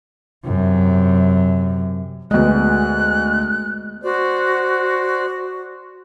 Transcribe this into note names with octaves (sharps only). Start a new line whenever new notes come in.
F#2 C3
D2 G#3 B3 D#5 F#6
F#4 C5 D5